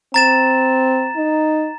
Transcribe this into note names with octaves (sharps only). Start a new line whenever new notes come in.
C4 A#5 A6 E7
D#4